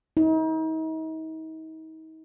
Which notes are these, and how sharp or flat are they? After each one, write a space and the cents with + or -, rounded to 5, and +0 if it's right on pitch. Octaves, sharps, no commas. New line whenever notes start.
D#4 +40